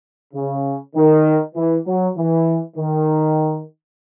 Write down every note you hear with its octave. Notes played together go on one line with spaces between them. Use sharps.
C#3
D#3
E3
F#3
E3
D#3